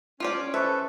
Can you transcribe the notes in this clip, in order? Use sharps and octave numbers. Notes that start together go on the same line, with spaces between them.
C#4 F4 G4 D5
A4 B4 C5 E5 A5 C#6